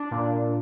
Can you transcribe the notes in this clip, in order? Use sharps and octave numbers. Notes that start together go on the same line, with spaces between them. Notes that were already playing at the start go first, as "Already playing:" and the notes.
Already playing: D4
A#2